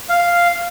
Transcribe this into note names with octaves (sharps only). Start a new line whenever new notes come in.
F5